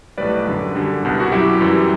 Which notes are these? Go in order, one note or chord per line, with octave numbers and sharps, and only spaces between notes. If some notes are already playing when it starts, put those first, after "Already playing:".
B1 A2 G3 B4 D5
F#2 D3 F#3
F#2 D3 G3
C2 B2 G3
F#4
F#2 F#3 E4 G4
F#2 E3 G3